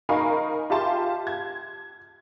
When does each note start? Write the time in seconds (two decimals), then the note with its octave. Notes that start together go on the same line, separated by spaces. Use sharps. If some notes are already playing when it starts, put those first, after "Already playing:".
0.09 D#4 A#4 F5 G#5 B5 C#6
0.70 F4 G4 E5 A5 C6
1.27 G#6